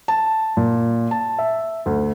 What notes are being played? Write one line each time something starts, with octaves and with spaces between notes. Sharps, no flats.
A5
A#2
A5
E5
D2